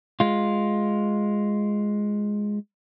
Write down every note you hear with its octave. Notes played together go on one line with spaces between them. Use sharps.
G#3 F4